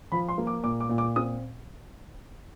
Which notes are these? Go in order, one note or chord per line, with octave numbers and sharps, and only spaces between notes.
F3 B5
C6
A#3
D6
A#2 D6
D6
A#2
D6
C4 D#6